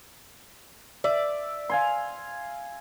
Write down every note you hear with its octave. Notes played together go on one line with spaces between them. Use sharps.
D5 E5
F5 G#5 C6